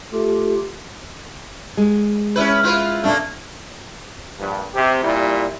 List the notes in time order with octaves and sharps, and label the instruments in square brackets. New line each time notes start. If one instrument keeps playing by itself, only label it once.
[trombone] A3 [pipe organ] F4 G4
[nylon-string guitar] G#3
[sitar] C#4 E4 B4
E4 F4 B4
[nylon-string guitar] A#2 D4 [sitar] A3 A#3
[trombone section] A#1 G2
C3 G4
A#2 G3 E4